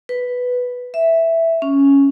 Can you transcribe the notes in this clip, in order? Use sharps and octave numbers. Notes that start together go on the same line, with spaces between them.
B4
E5
C#4